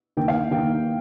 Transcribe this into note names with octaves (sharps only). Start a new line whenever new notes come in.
D#2 D#3 A#3 G5
F5
D#2 D#3 A#3 G5